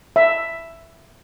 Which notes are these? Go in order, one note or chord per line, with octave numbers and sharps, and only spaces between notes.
E5